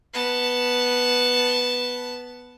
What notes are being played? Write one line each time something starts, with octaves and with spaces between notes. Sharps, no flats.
B3 A5